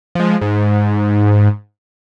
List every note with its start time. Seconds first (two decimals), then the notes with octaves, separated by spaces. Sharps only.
0.15 F3 G#3
0.41 G#2